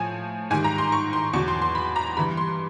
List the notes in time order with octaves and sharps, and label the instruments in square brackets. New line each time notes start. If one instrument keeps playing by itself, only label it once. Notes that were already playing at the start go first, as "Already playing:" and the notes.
Already playing: [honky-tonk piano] A2 F3 G#5
G#2 D#3 G3 G#5
A#5
C6
C#6
C6
E2 B2 F#3 C#6
C6
C6
B5
A#5
G2 E3 G3 B5
C6